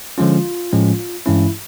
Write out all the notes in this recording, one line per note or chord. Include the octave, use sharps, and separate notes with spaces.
D3 F3 G#3 C#4 F4
A2 F3 G#3 C#4
G2 E3 G#3 C#4 E4